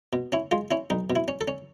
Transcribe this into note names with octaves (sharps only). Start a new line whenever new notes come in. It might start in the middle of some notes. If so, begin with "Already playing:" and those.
B2
C#4 E4
G#3 F4
C#4 E4
B1 D#4
B2
E4
C#4
A4
C#4